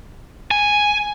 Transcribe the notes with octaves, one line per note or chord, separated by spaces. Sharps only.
G#5